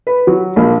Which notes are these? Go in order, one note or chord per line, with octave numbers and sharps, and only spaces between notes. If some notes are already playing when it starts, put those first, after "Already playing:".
B4
F#3
A#1